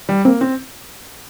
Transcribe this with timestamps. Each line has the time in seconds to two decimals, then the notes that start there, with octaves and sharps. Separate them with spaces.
0.09 G3
0.25 A#3 C4
0.41 C4